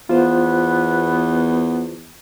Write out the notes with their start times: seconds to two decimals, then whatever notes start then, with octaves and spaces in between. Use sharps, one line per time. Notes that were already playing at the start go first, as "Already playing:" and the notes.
0.09 E2 B3 F4 C5